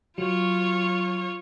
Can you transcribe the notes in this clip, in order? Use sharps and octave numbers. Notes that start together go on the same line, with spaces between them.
F#3 F4 C#5